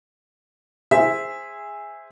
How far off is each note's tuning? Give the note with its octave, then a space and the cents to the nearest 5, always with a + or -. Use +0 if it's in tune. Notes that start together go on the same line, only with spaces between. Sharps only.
G#4 -15 C5 +0 E5 +0